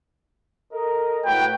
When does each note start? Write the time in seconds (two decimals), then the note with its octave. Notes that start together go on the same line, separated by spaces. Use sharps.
0.72 A4 A#4 D#5
1.25 A2 F#4 B4 G5